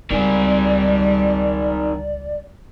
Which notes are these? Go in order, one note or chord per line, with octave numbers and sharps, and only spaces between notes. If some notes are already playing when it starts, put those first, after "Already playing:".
C#2 D#3 G3 G#4 D5